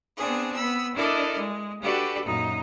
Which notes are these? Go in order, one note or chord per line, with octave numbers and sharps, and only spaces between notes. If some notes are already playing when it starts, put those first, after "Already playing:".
B3 C4 D4 G#4
B3 B5 E6
D4 E4 A4 A#4 D5 D#5
G#3
D4 F#4 G4 A4 B4 D5
F#2 A#2 D#4